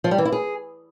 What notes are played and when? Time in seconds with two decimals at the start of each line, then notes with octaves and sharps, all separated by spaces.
0.04 F3
0.11 G3
0.18 E3
0.25 E4
0.32 G#4